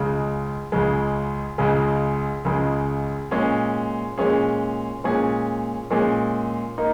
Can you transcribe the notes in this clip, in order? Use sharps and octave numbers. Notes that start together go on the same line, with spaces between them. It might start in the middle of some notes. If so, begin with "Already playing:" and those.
Already playing: C#2 C#3 G#3
C#2 C#3 G#3
C#2 C#3 G#3
C#2 C#3 G#3
A#2 G#3 C#4 G#4
A#2 G#3 C#4 G#4
A#2 G#3 C#4 G#4
A#2 G#3 C#4 G#4
A#3 D#4